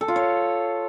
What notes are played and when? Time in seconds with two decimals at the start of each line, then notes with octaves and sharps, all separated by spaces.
0.01 A4
0.08 F4
0.16 C#5